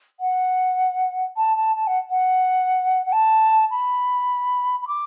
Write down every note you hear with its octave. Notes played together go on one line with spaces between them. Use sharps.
F#5
A5
A5
A5
F#5
F#5
F#5
A5
B5
B5
D6